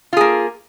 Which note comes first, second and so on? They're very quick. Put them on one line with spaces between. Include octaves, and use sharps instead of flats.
F4 G#4 A#3